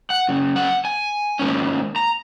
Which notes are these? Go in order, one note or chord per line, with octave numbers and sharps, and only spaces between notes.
F#5
F#2 C#3
F#5
G#5
G#2 D#3 A#3 C#4
A#5